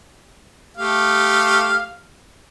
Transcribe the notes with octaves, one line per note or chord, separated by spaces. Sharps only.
A3 G4 F5